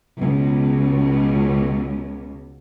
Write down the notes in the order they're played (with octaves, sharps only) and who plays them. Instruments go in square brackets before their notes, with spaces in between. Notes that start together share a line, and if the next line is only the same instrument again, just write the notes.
[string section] C#2 B2